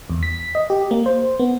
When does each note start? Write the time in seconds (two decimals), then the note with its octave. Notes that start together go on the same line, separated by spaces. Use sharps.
0.10 E2
0.23 B6
0.55 D#5
0.70 G4
0.91 A#3
1.06 C5
1.39 B3